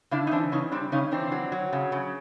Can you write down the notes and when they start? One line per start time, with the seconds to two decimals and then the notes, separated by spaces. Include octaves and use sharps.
0.11 C#3 D4 E4
0.27 D#4
0.31 E3 C4 D4
0.52 C#3 C#4 D#4
0.72 G3 C4 D4
0.92 C#3 C#4 D#4
1.11 E3 C4 D4
1.32 F#3
1.52 F#3
1.73 C#3
1.92 C#3